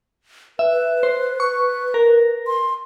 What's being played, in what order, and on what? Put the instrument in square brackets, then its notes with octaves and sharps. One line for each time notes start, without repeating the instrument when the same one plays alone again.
[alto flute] B4 [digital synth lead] E5
[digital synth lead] C5
C#6
A#4
[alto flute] C6